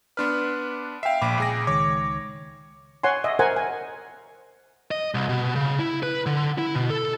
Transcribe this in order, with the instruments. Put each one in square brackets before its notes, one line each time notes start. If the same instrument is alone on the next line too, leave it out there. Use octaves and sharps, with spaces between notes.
[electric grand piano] B3 D4 B4 [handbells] C6 F6
[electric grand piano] E5 F5 [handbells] G5 C7
[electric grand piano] A#1 B5 D6 [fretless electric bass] A#2
[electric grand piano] C#2 G#4 A#6
[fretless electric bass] C#2 D#3 G#3 [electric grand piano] C#5 [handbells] D6
[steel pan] C#5 F#5 G#5 C6
D#5 E5
A#4 C5 F#5 G#5
G#5
[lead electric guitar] D#5
C2
B2
C#3
E4
B4
D3
E4
B2
A4